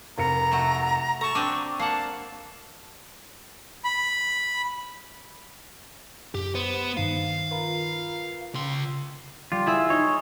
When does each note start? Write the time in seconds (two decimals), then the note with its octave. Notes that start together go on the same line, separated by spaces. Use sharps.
0.18 F1 A#4 A#5 C#7
0.52 A3 F#4
1.21 A4 A5 A#5 C#6
1.35 C4 D4 D6 D#7
1.79 A#3 F#5 A5 C7
3.84 B5
6.35 F#2 G4
6.55 B3 C5 E7
6.97 G2 D#3 F5
7.51 F4 A#4 B4
8.54 C#3 C6
9.52 G3 F4
9.66 E4 G#4 E5
9.90 D#4 C#5